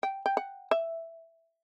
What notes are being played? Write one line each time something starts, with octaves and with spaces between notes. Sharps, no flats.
G5
G5
F#5
E5